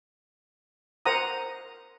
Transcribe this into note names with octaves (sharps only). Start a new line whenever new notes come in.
A#4 C5 F#5 A#5 D#6